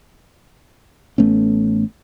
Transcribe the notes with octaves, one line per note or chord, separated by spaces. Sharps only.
A1 A3 B3 C#4